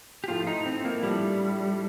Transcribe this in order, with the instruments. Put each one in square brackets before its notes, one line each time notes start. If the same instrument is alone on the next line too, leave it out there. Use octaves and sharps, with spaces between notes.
[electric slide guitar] G4
[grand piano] A2 F3 A3 [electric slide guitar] F4
[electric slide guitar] D#4
C4
A#3
[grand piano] A2 F3 A3 D4 [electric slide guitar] G3